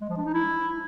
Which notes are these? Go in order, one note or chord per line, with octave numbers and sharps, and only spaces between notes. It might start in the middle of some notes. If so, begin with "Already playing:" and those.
G#3
F3
D4
D#4
E4